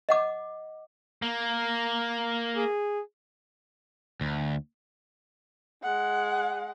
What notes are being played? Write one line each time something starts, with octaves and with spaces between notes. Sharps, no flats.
D#5 F#5 D6
A#3
G#4
D2
G#3 F#5